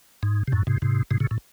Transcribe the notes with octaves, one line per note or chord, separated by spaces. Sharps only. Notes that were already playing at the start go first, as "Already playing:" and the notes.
G#2
C3
F#2 A2
G#2 C3
G#2 C3
G#2 C3
A2 C#3
A2